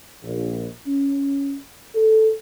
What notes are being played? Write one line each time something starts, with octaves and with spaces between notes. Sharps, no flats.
A#1
C#4
A4